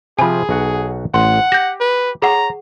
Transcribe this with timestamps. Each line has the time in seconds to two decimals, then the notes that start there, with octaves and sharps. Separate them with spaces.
0.19 C3 F3 G#4 G#5 B5
0.49 B1 F#4 F#5
1.14 A1 F#5 C6
1.52 G4 G6 A#6
1.80 B4
2.22 G#4 C#5 F#5 A#5